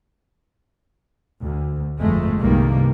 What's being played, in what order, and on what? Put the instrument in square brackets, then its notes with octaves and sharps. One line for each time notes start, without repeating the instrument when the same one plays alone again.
[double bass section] D2
G1 F2 G#2 G#3 A3
C2 G2 C3 D#3 G3 A#3